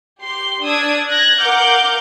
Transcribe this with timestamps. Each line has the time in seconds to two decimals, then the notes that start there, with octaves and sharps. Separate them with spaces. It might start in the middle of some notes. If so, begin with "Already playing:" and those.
0.21 G4 C6
0.63 D4 D#6 E6 G#6
1.09 F#6 G#6 A#6
1.40 A#4 F5 F#5 D6 F6 G6